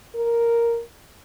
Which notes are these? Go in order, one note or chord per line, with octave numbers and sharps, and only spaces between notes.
A#4